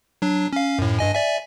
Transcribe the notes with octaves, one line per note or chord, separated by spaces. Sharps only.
F#3 D4
C#4 F5
F#2 A2
G2 D#5 G#5
D5 E5 G#5